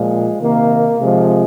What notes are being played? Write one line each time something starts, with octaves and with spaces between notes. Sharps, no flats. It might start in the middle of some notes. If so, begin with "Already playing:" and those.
Already playing: A#2 F3 G#3
C3 D#3 A#3
C3 F3 G#3